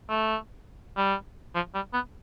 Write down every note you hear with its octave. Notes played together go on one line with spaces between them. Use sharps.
A3
G3
F3
G3
B3